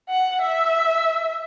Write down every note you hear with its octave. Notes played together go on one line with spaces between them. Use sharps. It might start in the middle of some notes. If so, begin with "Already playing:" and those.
F#5
E5